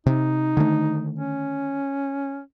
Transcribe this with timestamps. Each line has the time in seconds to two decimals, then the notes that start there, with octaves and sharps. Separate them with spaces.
0.06 C3 D#4
0.57 D3 D#3 A3
1.19 C#4